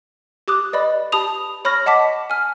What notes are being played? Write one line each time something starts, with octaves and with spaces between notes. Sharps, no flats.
G4 D6 D#6 F#6
B4 D5 D#5 B5
G4 A5 B5 D#6 F7
C#5 B5 C#6 F6 A#6
D#5 F#5 A5 D6 B6
G#5 F6